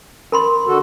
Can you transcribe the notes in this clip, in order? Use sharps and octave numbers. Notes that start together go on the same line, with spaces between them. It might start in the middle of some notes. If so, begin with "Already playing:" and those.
A#4 B5 C6
D3 F#4 A4